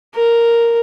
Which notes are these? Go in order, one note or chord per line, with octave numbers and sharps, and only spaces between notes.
A#4